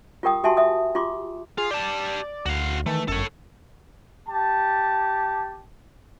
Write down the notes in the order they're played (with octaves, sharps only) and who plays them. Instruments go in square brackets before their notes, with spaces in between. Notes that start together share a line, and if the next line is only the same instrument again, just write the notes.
[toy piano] F4 G4 A#4 G5 D#6
F#4 G4 E5 G#5 A5 C6
E5 D#6
F4 G4 C6 D6
[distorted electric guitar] F4 [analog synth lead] G#4
[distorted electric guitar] G4 A5 [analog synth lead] D5
[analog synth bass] D2 [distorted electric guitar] F#4 F5
[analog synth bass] D#3 [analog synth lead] E3 [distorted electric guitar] A3
[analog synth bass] G1 [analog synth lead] F#2 [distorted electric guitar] A4 C#5
[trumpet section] G4 A5